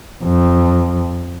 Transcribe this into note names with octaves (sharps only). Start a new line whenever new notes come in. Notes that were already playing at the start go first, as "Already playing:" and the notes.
F2